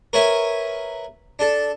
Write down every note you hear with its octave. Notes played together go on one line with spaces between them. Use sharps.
A#4 B4 C#5 E5 G#5
D4 A4